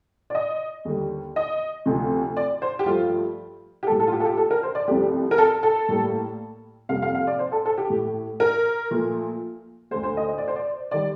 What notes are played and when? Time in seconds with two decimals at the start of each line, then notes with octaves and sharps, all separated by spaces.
0.30 D5
0.35 D#5
0.85 D#2 D3 G3
1.36 D#5
1.86 D2 C3 F3
2.37 D5
2.62 C5
2.79 G4
2.86 G2 F3 A3 F4
3.83 G4
3.87 A2 G3 A#3 A4
3.99 A4
4.07 F4
4.12 G4
4.20 A4
4.25 G4
4.37 A4
4.51 A#4
4.63 C5
4.75 D5
4.88 C2 C3 F3 A3 G4
5.31 A#4
5.38 A4
5.63 A4
5.88 A2 G3 A#3
6.89 F2 C3 G3 A#3 F5
7.02 F5
7.15 F5
7.27 D5
7.39 C5
7.52 A4
7.65 A4
7.78 G4
7.90 A2 A3
8.40 A#4
8.90 A#2 F3 A3
9.91 A3 C5
9.94 D2 D3
10.03 C5
10.17 D#5
10.28 D#5
10.38 D5
10.48 C5
10.56 D5
10.91 D#3 G3 D5